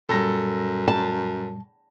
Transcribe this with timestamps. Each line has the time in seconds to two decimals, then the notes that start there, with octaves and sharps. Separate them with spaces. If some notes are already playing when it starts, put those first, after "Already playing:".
0.09 F#2 A#2 G3 A4 A#6
0.88 A5